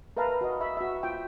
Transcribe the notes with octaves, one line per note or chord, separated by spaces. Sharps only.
A#4 B4 E5 F5 A5 A#5
F#4 D#5
E5 B5
F#4 E5
F4 G5